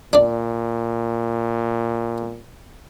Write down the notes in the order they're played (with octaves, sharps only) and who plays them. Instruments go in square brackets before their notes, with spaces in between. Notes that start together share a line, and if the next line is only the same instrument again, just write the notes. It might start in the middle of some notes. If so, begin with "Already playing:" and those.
[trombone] A#2 [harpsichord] D4 D5